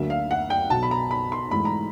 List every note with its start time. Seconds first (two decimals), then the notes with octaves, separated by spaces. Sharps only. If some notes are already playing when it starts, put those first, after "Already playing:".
Already playing: D2 D3 F#3 A#3 E5
0.10 F5
0.31 F#5
0.50 G5
0.70 B1 B2 F#3 A5
0.83 B5
0.91 A#5
1.11 B5
1.32 C6
1.51 G#2 E3 A3 B5
1.65 A#5